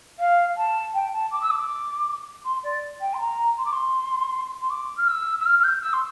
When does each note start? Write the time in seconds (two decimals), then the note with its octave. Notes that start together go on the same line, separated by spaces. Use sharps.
0.19 F5
0.57 A5
0.94 G5
1.13 A5
1.31 D6
1.42 E6
1.50 D6
2.45 C6
2.64 D5
3.01 G5
3.14 C6
3.20 A#5
3.58 C6
3.65 D6
3.73 C6
4.61 C6
4.70 D6
4.97 F6
5.08 E6
5.40 E6
5.45 F6
5.59 F6
5.64 G6
5.82 E6
5.93 C6